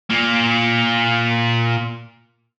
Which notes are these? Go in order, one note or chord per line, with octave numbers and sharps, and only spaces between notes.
A#2 A#3